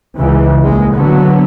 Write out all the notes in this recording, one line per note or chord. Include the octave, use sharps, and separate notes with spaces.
C#2 C#3 E3
A#1 G#3
D3 F#3 B3